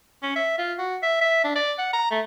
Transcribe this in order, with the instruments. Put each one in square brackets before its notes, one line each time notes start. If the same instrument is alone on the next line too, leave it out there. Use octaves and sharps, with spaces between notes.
[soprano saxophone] C#4
E5
F4
F#4
E5
E5
D4
D5
F#5
A#5
A3